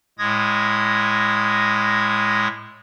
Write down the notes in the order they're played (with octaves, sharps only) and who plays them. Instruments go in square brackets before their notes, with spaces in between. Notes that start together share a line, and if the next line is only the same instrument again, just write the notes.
[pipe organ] A2 G#3 D#6 G#6 A#6